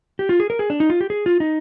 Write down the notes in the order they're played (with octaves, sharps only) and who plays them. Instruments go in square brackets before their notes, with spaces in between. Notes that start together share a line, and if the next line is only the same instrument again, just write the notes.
[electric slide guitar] G4
F4
G#4
A#4
G#4
D4
D#4
F4
G4
G#4
F4
D#4